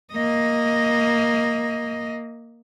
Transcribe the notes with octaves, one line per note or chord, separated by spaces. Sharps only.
A#3 D#5